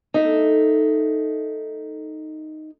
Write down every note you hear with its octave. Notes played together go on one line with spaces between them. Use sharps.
A3 D#4 E5